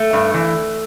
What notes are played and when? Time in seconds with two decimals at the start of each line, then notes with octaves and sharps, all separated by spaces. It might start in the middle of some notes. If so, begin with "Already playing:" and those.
Already playing: A3
0.13 G2
0.34 E3